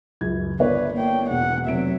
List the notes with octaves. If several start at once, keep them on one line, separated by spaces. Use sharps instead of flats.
C#2 F#2 G#6
G1 B4 C#5 D5
A#3 G5
E1 F#5
F1 F#3 E5 D7